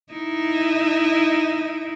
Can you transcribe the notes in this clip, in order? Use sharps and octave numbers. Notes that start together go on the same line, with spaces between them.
D#4 E4